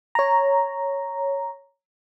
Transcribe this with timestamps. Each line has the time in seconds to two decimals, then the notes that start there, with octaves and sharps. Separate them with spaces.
0.15 C#5 A#5